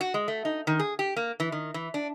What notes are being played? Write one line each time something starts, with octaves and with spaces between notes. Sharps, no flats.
F#4
G#3
A3
D#4
D#3
G#4
G4
A#3
E3
D#3
E3
D4